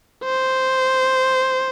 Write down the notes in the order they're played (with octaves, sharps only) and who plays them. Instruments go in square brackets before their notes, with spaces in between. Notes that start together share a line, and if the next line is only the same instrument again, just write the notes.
[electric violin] C5